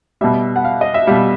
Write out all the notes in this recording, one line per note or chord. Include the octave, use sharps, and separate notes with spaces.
B2 G3 E5
F#5
F5
D#5
E5
B2 G3 F5